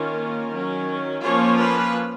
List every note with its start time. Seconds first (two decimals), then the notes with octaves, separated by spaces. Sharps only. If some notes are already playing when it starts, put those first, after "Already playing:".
Already playing: D#3 A#3 C#4 F4 A#4
0.50 D#3 F#3 C#4
1.22 F3 A#3 C#4 F4 C#5
1.60 B4